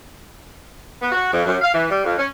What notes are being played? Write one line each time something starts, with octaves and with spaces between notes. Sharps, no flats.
B3
F#4
F2
F#2
F5
E3
G3
F2
C#4